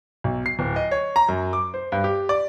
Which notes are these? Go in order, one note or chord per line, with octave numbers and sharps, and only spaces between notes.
B1
C7
D1
D#5
C#5
A#5
F#2
D6
C5
G2
G4
D5